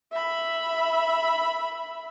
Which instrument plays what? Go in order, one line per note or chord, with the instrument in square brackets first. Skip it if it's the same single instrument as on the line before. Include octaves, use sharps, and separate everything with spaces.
[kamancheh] E5 B5